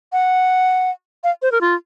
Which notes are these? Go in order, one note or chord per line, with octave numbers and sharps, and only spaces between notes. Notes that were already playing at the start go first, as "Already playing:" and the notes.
F#5
F5
C5
A#4
F4